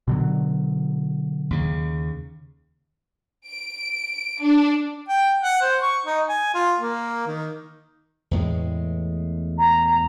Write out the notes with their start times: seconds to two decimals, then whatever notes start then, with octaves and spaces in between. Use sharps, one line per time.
0.08 B2 D3 F#3
1.51 D#2 C#3
3.47 D7
4.41 D4
5.08 G5
5.43 F#5
5.61 C5
5.82 C#6
6.06 D#4
6.29 G#5
6.54 F4
6.80 A#3
7.27 D#3
8.31 E2 A2 G#3
9.58 A#5